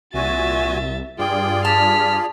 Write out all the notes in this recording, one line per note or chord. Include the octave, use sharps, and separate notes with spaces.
C2 A#2 F#4 E5 G#5 A6
G2 F4 G#4 D5 G5
A5 F6 B6